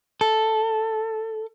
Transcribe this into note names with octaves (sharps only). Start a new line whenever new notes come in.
A4